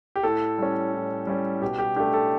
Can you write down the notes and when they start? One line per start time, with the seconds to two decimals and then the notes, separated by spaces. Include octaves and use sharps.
0.16 G4
0.23 A2 A4
0.58 G3 C#4
0.93 A2
1.27 G3 C#4
1.62 B2 G4
1.78 G4
1.96 A3 D4 G4
2.14 A4